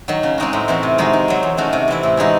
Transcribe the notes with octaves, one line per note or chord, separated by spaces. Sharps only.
D#3 F#3
C#3
G#3 C4 D#4 F#4
A2
E3 C4 F#4
C3
D#3 G#3 D#4 F#4
D#3
F#3 C4
E2
D#3 A3 C#4 F#4
C3
E3 C4 E4
A2
E3 G#3 D#4 F#4